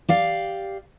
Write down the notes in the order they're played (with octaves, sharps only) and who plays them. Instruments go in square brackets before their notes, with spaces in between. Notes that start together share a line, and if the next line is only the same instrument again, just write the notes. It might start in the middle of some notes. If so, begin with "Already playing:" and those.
[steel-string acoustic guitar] G4 D5 F5